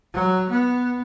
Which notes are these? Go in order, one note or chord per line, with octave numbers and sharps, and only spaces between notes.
F#3
B3